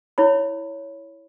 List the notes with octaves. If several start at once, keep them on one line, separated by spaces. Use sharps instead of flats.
E4 C#5 B5